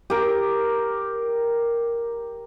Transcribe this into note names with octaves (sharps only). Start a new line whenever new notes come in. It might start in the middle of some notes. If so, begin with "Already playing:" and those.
G4 A#4